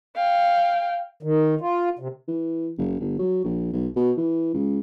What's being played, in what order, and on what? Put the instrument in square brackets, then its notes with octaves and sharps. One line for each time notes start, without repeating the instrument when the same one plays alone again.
[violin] F5 G5
[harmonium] D#3
F4
C3
[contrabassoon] E3
F#1
G1
F#3
A#1
B1
B2
E3
C#2